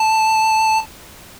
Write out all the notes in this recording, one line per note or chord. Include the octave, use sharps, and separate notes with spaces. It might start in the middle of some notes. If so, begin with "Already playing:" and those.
Already playing: A5